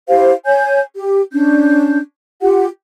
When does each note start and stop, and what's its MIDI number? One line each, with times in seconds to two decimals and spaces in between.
0.08 0.32 64
0.08 0.32 67
0.08 0.32 72
0.08 0.32 77
0.46 0.80 73
0.46 0.80 80
0.46 0.80 91
0.95 1.21 67
1.33 1.98 61
1.33 1.98 62
1.33 1.98 91
2.41 2.66 65
2.41 2.66 67
2.41 2.66 78